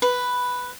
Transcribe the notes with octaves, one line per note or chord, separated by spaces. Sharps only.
B4